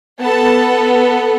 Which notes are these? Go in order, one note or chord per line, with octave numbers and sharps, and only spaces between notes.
B3 A4 A5